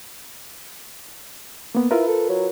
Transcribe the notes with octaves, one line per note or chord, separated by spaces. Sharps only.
A#3 B3
E4 F4 A#4 B4
A4
F#3